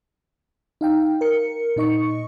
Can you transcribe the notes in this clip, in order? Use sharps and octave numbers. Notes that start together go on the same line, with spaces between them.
D#4 F5 G5
A#4 C#7
A#2 D#4 D#5 C#6 C#7